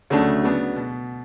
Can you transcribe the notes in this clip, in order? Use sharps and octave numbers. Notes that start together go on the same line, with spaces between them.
D2 C#3 F#3 A3 D4
C#3 F#3 B3 D4
B2